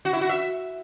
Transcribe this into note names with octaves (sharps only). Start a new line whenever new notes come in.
F#4
E4
F#4
E5